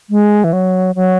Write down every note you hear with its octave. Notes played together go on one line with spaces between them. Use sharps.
G#3
E3
F#3
F#3